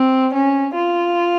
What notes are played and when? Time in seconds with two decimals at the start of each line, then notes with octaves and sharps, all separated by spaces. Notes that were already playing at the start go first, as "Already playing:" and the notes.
Already playing: C4
0.34 C#4
0.74 F4